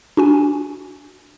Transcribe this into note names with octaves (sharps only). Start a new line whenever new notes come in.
D4 F#4 G#5